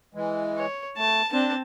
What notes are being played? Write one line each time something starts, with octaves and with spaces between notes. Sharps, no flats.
E3 G#3
C#5
A3 A5
C4 D4 A5